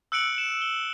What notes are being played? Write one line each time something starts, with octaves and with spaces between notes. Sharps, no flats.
E6 F#6 C#7 D7 F#7
E7
G7